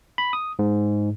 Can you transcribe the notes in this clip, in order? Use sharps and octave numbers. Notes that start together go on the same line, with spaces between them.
B5
D#6
G#2